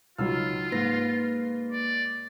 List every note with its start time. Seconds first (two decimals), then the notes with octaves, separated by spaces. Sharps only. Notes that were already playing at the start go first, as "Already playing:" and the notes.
0.19 C#2 F#3 D#4 F4 E6 F6
0.72 G#2 A#3 B4 A#6
1.72 D5